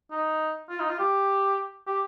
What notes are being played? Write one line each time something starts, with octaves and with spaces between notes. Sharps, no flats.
D#4
F4
D#4
F4
G4
G4